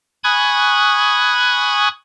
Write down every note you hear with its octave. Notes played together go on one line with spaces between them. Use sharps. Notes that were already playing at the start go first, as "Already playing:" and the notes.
G#5 B5 C#6 D#6 F#6 G#6